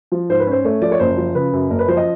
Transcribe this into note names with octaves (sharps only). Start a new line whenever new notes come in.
F3
G#2 C5
B4
C#4 C5
A3 C#5
F3 D5
C#5
F#1 C5
F3
C#3 B4
F#2
F#1 A#4
B4
F3 C5
D#5